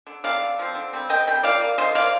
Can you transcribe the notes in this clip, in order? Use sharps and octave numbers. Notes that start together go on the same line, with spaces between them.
D3
F3 C4 D5 F5
D3
F3 C4
D3
G3 C4
D3 D#5 G5
G3 C4 G5
F3 D5 F5
A#3
F3 C5 D#5
A#3 D5 F5